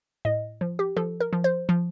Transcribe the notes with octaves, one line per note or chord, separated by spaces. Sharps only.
A2 D#5
F3
G4
F3 A4
A#4
F3
C5
F3